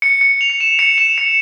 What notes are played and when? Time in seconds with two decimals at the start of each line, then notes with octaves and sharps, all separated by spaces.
0.02 C#7
0.21 C#7
0.41 F7
0.50 C#7
0.60 E7
0.79 C#7
0.98 E7
1.18 C#7